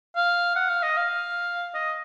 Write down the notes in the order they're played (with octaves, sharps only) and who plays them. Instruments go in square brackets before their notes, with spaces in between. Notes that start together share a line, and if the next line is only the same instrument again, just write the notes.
[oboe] F5
F#5
F5
D#5
F5
D#5